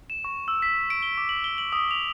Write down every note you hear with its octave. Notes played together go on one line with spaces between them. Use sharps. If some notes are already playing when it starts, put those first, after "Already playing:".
E7
C#6
E6
B6
D7
G7
D6
F#7
G7
F#7
D#6
F7